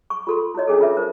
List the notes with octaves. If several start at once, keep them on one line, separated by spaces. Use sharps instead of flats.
C#6
F4 A4 C6
E4 F#4 C#5 D#5
C#4 D4 G#4 A4
F4 A4 B4 E5
D#4 A#4 C5